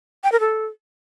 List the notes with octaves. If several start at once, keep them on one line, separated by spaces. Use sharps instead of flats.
G5
A#4
A4